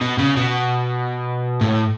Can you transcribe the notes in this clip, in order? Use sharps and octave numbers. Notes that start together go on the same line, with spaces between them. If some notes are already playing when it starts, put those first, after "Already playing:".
B2
C#3
B2
A2